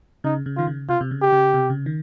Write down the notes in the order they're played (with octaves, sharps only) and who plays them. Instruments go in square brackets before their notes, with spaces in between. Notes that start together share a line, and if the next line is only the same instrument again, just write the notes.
[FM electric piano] C#3 [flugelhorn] D#4
[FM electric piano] C#3
[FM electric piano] D#3 [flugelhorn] F4
[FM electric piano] C#3
[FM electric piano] C3 [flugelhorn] F4
[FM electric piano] C3
C#3
[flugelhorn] G4
[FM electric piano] C#3
C3
C#3
D#3